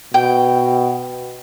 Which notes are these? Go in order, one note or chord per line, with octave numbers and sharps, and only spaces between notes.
B2 G5